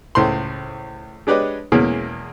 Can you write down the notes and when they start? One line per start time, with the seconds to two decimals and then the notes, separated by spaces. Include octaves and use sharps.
0.15 C#2 A2 C5 C6
1.27 G#3 D4 G4 B4 C#5 D#5
1.72 E2 B2 E3 G#3 A#3 C#4